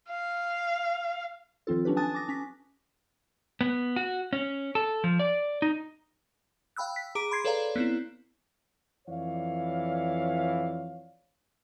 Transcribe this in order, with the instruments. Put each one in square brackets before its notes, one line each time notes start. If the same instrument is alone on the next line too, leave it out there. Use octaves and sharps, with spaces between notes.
[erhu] F5
[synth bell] D#3 F3 C4 F4 A4
F#3 C#4 D4 G4 B4
G#5 A5 D#6 F#6 A6
D6 A#6
C#4 B6
[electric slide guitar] B3
F#4
C#4
A4
F3
D5
D#4
[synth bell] F5 G5 B5 E6 F#6
B6
G#4 A#5 D6 D7
B5 C6 G#6 C7
A4 B4 C#5 D5 F5 A#5
B3 C4 E4
[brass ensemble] F2 E3 C#5 D5 F5